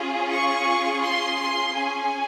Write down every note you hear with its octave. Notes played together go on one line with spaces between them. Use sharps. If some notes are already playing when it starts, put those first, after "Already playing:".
Already playing: C#4 F4 G#4
C#6
C6
C6
C#4 G#4 G#5